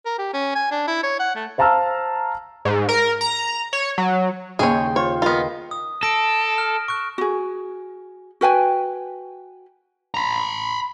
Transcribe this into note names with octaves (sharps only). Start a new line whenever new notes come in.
A#4
G4
C#4
G#5
D4
E4
C#5
F#5
A3
C5 F5 A5 A#5 E6 F6
G#2
A#4
A#5
C#5
F#3
D#2 C#3 G#4 C#5 G5 C6
F4 C5 C#5
B3 F4 A#4 D#5
D#6
A4 A#6 D7
F6
C#6 F#6
F#4 G#4
F#4 B4 G5 G#5
A#5 B5